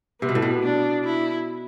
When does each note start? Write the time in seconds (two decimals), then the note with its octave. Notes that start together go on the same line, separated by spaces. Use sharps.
0.21 C3 B3
0.29 B2
0.35 A2
0.42 B2
0.63 D4
1.04 E4